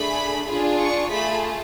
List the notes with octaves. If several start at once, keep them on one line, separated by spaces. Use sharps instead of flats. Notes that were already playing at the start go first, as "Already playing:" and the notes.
Already playing: A3 D4 G#4 B5
D4 F4 G#4
C#6
A3 F4 G#4 B5